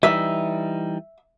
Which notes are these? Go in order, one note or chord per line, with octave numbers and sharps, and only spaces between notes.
E3 G3 D#4 E5